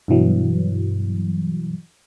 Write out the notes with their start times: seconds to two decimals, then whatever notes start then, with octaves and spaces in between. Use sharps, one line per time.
0.08 G2 B2 E3 F#3